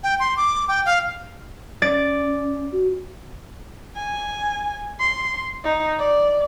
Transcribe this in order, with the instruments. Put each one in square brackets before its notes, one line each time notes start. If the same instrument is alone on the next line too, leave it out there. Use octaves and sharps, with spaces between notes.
[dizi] G5
C6
D6
G5
F5
[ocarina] C#4 [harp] D5 A6 D7
[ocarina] F#4
[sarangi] G#5
C6
D#4
D5